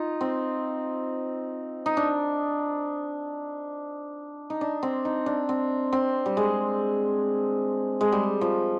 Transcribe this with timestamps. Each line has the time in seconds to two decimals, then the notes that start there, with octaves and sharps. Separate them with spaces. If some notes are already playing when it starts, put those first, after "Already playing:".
Already playing: D#4 F4
0.21 C4
1.86 D#4
1.97 D4
4.50 D#4
4.61 D4
4.83 C4
5.05 D#4
5.26 D4
5.49 C4
5.93 C4
6.26 G3
6.37 G#3
8.01 G#3
8.12 G3
8.41 F3